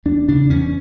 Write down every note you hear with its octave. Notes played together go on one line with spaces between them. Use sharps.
E2 D4
C#3 D4
E2 C#4